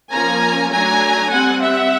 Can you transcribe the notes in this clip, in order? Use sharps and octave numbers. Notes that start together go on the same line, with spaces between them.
F3 A#3 C#4 G#5 A#5
F#3 A3 D4 G#5 A#5
G3 C4 F#5 G#5
E5 F#5